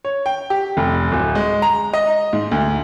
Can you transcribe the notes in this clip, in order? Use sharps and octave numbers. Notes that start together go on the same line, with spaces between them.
C#5
G5
G4
F1
D1
G#3
A#5
D#5
G#2
D2